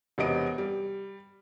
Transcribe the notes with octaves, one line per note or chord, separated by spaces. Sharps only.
E1 C3 B3 D#5 D7
G3